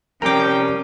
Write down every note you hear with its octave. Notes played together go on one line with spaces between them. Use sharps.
C2 F3 G3 C#4 A#4 G5 A#5 D6